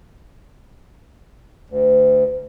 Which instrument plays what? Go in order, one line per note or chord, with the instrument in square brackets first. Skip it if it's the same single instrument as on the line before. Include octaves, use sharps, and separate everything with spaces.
[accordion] D2